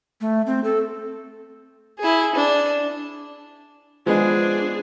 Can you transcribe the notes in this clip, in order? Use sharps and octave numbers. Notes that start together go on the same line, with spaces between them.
A3
C4
A4
E4 G#4
D4
F3 G#3 B3 D4 G#4